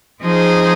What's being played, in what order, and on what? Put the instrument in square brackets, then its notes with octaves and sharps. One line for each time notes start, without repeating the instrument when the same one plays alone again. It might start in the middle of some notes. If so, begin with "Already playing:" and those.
[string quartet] F3 C4 D#4 G#4 C5